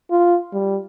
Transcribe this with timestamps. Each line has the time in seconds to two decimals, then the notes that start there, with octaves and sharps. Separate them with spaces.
0.11 F4
0.53 G3